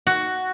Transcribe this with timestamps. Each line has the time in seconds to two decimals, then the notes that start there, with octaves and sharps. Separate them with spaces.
0.07 F#4